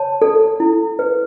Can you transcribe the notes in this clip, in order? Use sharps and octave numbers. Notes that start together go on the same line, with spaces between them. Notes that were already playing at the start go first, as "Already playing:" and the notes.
Already playing: C#5 A5
A4
E4
B4